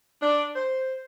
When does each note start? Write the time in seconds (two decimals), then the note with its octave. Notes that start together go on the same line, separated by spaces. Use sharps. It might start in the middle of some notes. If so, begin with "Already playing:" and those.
0.22 D4
0.56 C5